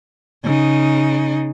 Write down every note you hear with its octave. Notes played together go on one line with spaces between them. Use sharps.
C#3 D#4